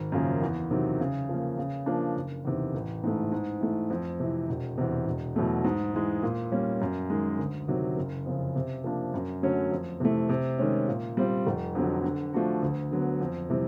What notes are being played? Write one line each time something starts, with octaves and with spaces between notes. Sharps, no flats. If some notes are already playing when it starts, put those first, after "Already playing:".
Already playing: G#1
F#2 C#3 F3 A#3
E2
C3 D#3 F#3
C#3
F3 A#3
C#3
F3 A#3 D4
F#1
E2 C3 D#3
A1
G#2 E3 A3
G#2
E3 A3
F2
C3 E3
E1
E2 C3
E1
E2 B2 F#3 A3
G#2
E3 G#3
A#2
G3 A#3 C#4
F#2
D#3 G#3
D2
C3 D#3 F#3
F#1
F2 C#3
C3
F3 A#3 D4
F#2
D3 F#3 A3 C#4
F2
C3 E3 A3
C3
D#3 G#3 C#4
A#2
G3 C4 F4
F1
F2 D3 F#3
D3
F3 A3 D4 F#4
D2
D3 F#3 B3
F2
C3 E3 G3